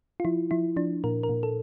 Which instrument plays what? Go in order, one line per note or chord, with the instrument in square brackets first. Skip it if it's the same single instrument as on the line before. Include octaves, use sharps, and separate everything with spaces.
[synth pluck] F4
F3 E4
F3 E4
F3 D4
A#2 A#4
A#4
A#2
A4